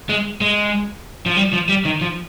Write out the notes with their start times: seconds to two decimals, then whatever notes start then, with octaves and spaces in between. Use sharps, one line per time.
0.09 G#3
0.41 G#3
1.26 F3
1.37 G3
1.53 F3
1.69 G3
1.85 D#3
2.01 F3